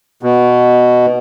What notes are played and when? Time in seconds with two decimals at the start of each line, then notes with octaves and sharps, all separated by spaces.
0.23 B2